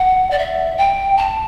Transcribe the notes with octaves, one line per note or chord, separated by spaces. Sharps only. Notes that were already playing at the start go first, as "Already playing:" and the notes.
Already playing: F#5
D5
E5
G5
A5